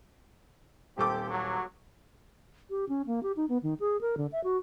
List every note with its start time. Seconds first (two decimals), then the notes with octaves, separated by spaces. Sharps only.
0.98 D#1 C4 G4 A4 D6
1.31 F#3
2.70 G4
2.89 C#4
3.07 A#3
3.23 G4
3.37 D#4
3.49 B3
3.63 D#3
3.80 G#4
4.01 A#4
4.17 D3
4.32 E5
4.44 F#4